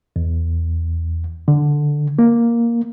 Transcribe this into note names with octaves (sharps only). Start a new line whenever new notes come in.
E2
D3
A#3